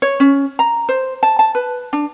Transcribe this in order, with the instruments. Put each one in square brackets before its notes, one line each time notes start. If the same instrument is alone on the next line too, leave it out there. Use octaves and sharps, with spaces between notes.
[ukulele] C#5
C#4
A#5
C5
A5
A5
B4
D4